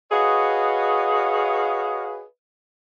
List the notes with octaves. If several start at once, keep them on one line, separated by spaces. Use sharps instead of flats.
F#4 G#4 B4 C#5 D#5 F5